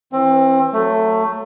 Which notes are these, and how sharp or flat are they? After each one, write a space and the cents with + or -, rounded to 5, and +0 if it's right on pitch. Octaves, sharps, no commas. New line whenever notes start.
E3 +0 C4 +30
F#3 +0 A3 +15